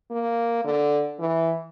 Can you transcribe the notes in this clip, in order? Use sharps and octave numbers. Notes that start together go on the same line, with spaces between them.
A#3
D3
E3